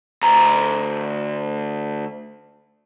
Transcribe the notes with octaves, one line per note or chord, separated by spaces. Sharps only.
D2 A#5